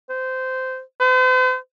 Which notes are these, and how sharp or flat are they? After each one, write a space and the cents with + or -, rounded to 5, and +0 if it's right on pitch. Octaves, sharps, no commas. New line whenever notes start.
C5 -15
C5 -45